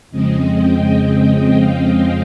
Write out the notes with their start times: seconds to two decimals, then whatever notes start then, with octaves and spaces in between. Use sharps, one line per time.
0.11 F2 C#3 G#3 C4 D#5
0.59 G5
1.55 F5